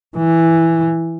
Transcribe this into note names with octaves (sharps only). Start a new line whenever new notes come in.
E3